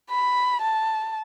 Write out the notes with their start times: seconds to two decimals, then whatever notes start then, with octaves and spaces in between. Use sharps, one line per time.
0.10 B5
0.62 A5